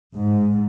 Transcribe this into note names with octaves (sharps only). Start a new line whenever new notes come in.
G#2